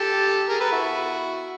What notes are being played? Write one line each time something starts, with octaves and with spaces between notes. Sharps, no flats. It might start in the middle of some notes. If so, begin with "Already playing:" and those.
Already playing: G4 A4
G#4 A#4
A4 B4
E4 F#4